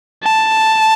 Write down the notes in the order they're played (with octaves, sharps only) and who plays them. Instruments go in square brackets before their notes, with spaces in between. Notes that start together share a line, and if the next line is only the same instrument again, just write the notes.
[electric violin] A5